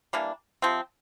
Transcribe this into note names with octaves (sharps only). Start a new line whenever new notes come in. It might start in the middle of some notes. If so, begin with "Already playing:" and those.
E3 G3 A#3 D4
C3 F3 C4